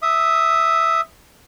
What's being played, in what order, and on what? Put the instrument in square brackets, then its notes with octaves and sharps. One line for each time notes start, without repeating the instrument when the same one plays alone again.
[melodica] E5 D#6